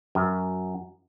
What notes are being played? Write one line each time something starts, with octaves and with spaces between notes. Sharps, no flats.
F#2